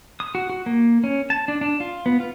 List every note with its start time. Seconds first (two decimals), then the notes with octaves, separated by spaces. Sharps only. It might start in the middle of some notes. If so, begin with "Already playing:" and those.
0.20 D#6
0.35 F#4
0.50 F#4
0.66 A#3
1.04 C#4
1.30 A5
1.48 D4
1.61 D4
1.80 F4
2.06 B3
2.20 F4